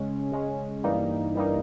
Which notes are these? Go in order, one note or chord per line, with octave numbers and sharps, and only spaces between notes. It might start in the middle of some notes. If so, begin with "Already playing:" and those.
Already playing: C#3 G#3 C#4
C#3 G#3 C#4
G2 E3 G3 A#3 D#4
G2 E3 G3 A#3 D#4